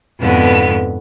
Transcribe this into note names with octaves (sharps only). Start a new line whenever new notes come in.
F2 G#2 B2 D3 B3